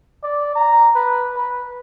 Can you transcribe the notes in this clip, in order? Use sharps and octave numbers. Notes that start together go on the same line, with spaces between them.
D5
A#5
B4
B4